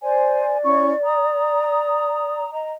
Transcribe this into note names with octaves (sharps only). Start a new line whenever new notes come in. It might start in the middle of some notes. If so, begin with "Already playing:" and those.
C5 D5 G#5
C#4 E4 C#6
A#5 D#6
D#5 A#5